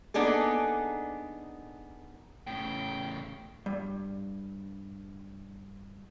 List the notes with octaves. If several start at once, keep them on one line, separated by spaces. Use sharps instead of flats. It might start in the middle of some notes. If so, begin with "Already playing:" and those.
A#3 B3 D4 D#4 G#4 A4
A2 C#3 G5
G2 G3